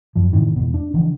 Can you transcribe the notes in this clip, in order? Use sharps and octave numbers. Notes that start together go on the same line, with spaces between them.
F#2 F3
A2 C3 D#3 E3
E2 B2
D4
C#3 E3 F3 D4